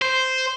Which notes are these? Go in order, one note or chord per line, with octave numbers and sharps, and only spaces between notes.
C5